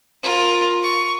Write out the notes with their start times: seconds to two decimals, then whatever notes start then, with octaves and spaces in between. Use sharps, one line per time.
0.23 F4 A#4
0.83 C#6